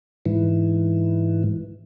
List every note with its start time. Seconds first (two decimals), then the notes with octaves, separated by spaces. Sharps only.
0.26 G#2 E3